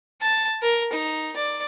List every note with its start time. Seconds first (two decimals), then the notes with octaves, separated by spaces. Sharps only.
0.22 A5
0.62 A#4
0.92 D#4
1.36 D5